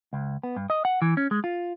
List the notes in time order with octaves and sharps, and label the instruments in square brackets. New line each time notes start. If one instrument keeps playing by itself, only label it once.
[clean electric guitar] C#2
B3
G2
D#5
F#5
E3
C#4
G#3
F4